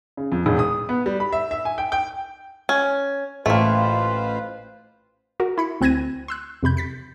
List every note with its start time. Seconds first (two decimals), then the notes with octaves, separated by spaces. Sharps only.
0.17 C#3
0.32 F2
0.46 E1
0.59 D#6
0.89 B3
1.06 G3
1.20 B5
1.32 E5
1.51 E5
1.65 G#5
1.78 G5
1.92 G5
2.69 C#4
3.46 A1 A3 A#3 F4 B4 C5
5.40 F#4 A#4
5.58 E4 B5 C#7
5.81 D2 C4 F#6 G#6 A#6 D#7
6.28 C6 E6 F#6
6.63 F2 C3 B5 G6
6.77 A6 B6 C#7